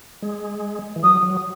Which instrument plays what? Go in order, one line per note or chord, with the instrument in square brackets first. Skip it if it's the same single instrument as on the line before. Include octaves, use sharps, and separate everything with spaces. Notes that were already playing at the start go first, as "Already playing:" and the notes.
[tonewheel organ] G#3
E3
[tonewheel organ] F#3 [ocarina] D#6
[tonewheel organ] F#3